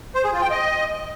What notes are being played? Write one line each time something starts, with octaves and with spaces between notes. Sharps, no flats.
C5
G#4
F4
G5
D#5